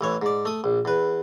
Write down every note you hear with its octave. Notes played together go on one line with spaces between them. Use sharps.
A1 E3 C#5
G#2 D5
A3 D#6
A#1
E2 B4